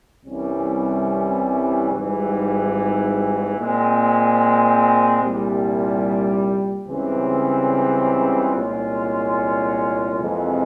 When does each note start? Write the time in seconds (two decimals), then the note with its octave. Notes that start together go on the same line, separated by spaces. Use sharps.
0.24 C2 C3 E3 G3 C#4
1.90 G#1 G#2 E3 G3
3.56 A#2 G#3 C4
5.21 C2 A#2 G3
6.88 C#2 C#3 E3 G3 C4
8.53 C2 A#2 G#3 C#4 F4
10.18 F2 C3 E3 G#3